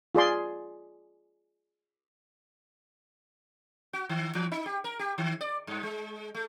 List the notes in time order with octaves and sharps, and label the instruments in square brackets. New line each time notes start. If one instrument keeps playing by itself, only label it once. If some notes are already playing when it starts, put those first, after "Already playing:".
[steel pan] F4 G#4 D5 C6
[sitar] F#4
D#3
E3
D#4
G4
A#4
G4
D#3
D5
G2
G#3
A3